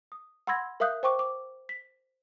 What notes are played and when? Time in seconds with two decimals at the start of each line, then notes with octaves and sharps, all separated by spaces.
0.12 D#6
0.47 F#5 B5 C6 E6 G#6 A#6
0.80 A#4 E5 F5 D#6 F#6 G6
1.03 C5 G5 C#6 D6
1.19 D6
1.69 B6